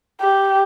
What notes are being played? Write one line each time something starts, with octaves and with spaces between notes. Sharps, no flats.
G4